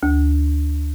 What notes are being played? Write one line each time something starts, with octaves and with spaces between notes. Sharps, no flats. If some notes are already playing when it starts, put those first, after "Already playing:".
D2